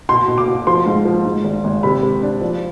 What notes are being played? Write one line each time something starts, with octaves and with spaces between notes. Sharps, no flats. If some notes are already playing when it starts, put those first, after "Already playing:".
B2 C6
B2
D6
B2
F3 C6
G#2
F3
G#2
G#1
G#1
C3 B5
C3
D4
F3